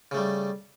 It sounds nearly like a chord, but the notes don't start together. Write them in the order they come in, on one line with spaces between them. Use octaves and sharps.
C#3 A3 G3